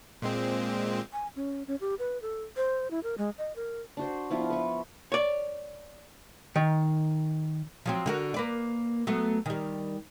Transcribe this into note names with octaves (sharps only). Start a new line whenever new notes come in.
A#2 G#3 C4
G#5
C#4
C#4
G4
B4
A4
C5
E4
A#4
G#3
D#5
A#4
D4 F#4 C5
F3 B3 E4 F4
B4 C#6
C#5 D5
D#3
F3 F#3 C4
D3 F#4 A#4
A#3 B4 D5
F#3 A3 B3
D#3 G3